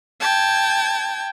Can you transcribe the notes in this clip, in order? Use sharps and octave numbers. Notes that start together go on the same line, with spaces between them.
G5 A5 G#6